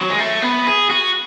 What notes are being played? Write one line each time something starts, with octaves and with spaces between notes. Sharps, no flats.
F#3
G#3
A3
B3
G#4
F#4